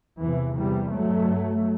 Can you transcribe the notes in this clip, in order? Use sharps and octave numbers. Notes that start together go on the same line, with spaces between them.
E2 C3 E3
E2 C3 E3 G3
G2 F#3 A3
G2